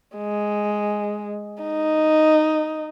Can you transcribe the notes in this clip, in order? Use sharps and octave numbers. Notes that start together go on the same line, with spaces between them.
G#3
D#4